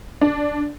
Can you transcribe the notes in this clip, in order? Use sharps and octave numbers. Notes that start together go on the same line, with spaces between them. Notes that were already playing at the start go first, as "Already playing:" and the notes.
D4